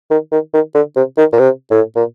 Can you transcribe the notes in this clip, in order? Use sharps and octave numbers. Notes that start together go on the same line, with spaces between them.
D#3
D#3
D#3
D3
C3
D#3
A#2
C3
A2
A#2